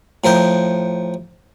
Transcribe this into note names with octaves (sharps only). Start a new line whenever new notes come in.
A2 F3 A#4 G5